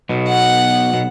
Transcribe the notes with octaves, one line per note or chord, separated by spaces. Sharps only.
B1 B2
F#5
B2